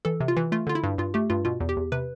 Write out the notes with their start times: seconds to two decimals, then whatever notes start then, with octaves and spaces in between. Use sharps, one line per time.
0.05 E3 A4
0.20 C3
0.28 F4
0.37 E3
0.52 A3 F4
0.67 D3 F4
0.75 E4
0.83 G2
0.98 G2 F4
1.14 A3 G4
1.30 G2 F4
1.45 B2 F4
1.60 E2
1.69 G4
1.77 E2
1.92 C3 B4